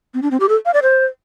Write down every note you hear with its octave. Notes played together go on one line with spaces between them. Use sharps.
C4
D4
C4
G4
A4
F5
D5
C5